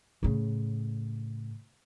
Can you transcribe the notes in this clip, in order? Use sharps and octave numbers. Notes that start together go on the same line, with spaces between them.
A2 C#3